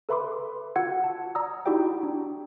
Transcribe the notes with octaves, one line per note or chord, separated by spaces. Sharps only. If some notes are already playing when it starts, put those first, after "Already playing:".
A4 B4 E5 B5 C6 D6
F4 F#4 F#5 E6 G#6 C#7
A5
D5 A#5 D#6 E6
D#4 E4 F#4 G4 D5 G5
D4